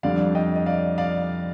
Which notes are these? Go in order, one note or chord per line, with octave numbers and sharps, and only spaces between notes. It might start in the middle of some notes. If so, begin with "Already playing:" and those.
F2 D3 G3 D5 F5
D#5 G5
D#5
D5 F5
D5 F5